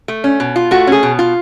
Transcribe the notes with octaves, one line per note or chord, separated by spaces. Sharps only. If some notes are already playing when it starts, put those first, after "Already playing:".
A3
C#4
B2
F4
A3 F#4
C#4 G#4
B2
F4